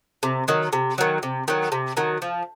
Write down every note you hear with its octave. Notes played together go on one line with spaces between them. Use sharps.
C3
D#3 F#3
C3
D#3 F#3
C3
D#3 F#3
C3
D#3 F#3
F3